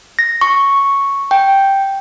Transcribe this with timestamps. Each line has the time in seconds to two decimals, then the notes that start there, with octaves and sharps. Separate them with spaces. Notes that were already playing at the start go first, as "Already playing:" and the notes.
0.19 A#6
0.41 C#6
1.31 G5